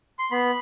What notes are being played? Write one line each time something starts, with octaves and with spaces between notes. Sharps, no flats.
C6
B3 B5